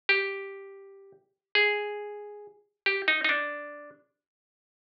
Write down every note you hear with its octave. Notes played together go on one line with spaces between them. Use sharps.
G4
G#4
G4
D#4
D#4
D4